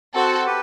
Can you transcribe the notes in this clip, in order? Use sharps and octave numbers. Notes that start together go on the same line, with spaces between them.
C4 F#4 A4
G4 B4